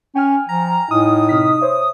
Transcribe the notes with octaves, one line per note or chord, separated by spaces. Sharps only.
C#4 G5 G#5 F6
F3 A#5
A2 D#4 D#6
C3 F6 B6
C5 C#5 E5